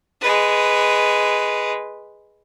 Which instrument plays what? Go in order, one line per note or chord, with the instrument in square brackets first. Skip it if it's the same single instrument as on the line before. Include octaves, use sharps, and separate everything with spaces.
[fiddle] G#3 B4